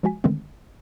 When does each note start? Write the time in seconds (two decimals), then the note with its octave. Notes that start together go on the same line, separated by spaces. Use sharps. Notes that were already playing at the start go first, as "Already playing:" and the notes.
0.03 F3 G#3 F#4 G#5 B6
0.24 D3 D#3 G#3 A3 B3 C4